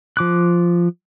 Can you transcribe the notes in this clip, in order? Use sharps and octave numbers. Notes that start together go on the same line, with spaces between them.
F3 D6 F#6